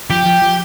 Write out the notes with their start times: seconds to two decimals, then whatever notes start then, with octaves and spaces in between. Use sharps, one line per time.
0.10 F3 G4
0.26 F3
0.42 F3